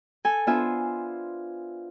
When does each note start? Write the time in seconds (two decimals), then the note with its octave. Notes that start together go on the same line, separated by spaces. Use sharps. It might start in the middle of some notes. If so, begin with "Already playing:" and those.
0.25 A4 G#5
0.47 B3 D4 F4 C5 E5 G#5